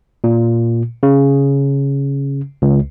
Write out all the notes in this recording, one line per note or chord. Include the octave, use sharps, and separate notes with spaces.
A#2
C#3
C#2